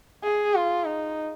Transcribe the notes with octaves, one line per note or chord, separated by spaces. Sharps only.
G#4
F4
D#4